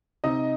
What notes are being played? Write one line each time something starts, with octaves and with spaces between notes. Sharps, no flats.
C3 D#4 D#5